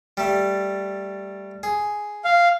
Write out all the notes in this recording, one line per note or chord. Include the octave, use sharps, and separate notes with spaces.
G3 A3
G#4
F5